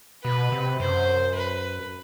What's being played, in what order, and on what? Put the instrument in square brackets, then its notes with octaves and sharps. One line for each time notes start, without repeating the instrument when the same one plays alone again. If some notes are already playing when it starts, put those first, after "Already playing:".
[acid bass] B2 [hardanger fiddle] B4
[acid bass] C3
[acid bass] F#2 [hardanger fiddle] C5
[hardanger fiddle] B4